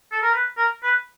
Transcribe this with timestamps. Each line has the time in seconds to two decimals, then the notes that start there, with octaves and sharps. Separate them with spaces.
0.12 A4
0.22 A#4
0.33 B4
0.57 A#4
0.83 B4